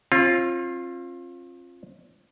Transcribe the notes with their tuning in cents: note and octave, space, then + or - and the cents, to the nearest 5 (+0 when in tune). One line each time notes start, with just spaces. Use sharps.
C4 +40 F4 +0